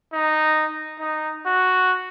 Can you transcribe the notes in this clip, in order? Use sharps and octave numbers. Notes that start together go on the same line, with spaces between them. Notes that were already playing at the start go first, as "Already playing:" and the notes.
D#4
D#4
F#4